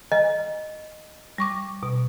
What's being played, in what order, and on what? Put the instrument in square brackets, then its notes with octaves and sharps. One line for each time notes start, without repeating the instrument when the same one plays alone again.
[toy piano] D#5
[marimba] G3 C#6 D6
B2